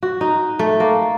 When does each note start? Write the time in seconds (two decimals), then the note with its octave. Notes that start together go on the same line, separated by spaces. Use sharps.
0.03 F#4
0.21 D#4
0.59 A3
0.80 A#3